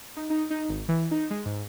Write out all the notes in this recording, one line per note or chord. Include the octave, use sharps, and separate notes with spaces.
D#4
D#4
D#4
G#1
E3
D#4
G#3
G#2